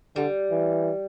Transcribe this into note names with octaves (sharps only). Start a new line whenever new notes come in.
D3 G3
E3